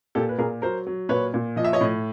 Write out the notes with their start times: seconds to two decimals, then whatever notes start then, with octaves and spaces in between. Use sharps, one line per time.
0.15 A#2 G4 A4
0.29 B4
0.38 A#2 G#4 A#4
0.62 F#3 A#4 C5
0.87 F#3
1.09 A#2 B4 C#5
1.34 A#2
1.56 F3 D#5
1.64 E5
1.73 C#5 D#5
1.81 A2